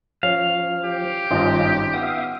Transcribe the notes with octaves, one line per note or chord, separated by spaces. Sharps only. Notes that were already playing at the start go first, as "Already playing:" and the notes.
F3 C#4 F5
G4
G#1 G2 C#4 F4 D#5
B3 E5 F5 D#6